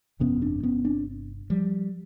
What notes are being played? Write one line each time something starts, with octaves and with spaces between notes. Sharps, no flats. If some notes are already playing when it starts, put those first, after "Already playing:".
G1 F2 C3 B3 C#4
C4 D4
B3 C#4
C4 D4
F3 G3